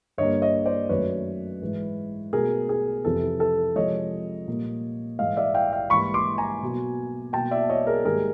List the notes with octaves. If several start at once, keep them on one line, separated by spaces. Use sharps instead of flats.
G2 D3 G3 A#3 C#5 D#5
C#5 D#5
C5 D5
F#2 D#3 F#3 A3 B4 C#5
G#2 E3 G#3
B2 F#3 A3 G#4 A#4
G#4
F2 C3 E3 A4
A4
C3 F3 G#3 C#5 D#5
A#2 G3 A#3
G#2 E3 G#3 D#5 F5
D5 E5
F5 G5
F5 G5
G#2 E3 G3 A#3 B5 C#6
C6 D6
G#5 A#5
B2 F#3 A#3
B2 F#3 A#3 G5 A5
D5 E5
C#5 D#5
G#4 A#4
G#2 D#3 G3 A#3 G#4 A#4